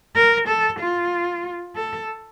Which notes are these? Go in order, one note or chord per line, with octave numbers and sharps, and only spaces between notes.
A#4
A4
F4
A4